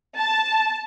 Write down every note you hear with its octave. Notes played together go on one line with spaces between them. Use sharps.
A5